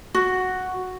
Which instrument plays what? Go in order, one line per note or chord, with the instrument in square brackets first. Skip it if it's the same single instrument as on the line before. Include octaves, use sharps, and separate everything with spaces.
[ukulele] F#4